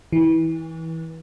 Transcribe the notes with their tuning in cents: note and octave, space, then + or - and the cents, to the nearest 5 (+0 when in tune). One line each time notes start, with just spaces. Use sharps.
E3 -25